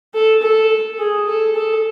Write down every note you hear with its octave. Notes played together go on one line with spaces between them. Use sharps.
A4
A4
G#4
A4
A4